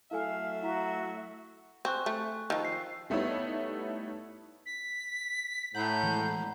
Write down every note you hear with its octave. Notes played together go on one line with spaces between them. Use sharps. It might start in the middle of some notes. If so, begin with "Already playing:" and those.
F#3 A3 E4 A4 E5 F5 G#5
E4 F#4 A#5 B6
C4 G#5 C#6 F#6
A3
D#3 F3 E6
C7
G3 A3 B3 D#4 E4 C#5
B6
A2 F#5 A#5 B5 G6
E3 F3 G#3